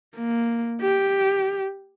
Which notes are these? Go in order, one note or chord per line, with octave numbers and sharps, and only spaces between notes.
A#3
G4